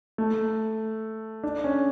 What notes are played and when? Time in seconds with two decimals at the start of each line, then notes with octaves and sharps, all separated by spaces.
0.18 A3
1.43 D4
1.64 C#4